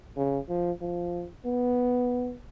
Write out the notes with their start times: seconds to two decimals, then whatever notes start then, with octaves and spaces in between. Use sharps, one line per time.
0.16 C#3
0.49 F3
0.81 F3
1.45 B3